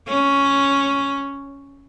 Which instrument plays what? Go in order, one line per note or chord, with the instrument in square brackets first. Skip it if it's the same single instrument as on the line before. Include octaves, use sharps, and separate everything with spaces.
[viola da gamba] C#4